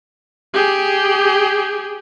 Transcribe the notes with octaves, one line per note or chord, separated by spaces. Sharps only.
G4 G#4